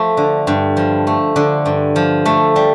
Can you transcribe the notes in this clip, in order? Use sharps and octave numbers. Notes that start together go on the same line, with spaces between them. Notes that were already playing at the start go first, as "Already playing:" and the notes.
Already playing: F3 A3
D3
G2
F3
A3
D3
G2
F3
A3
G3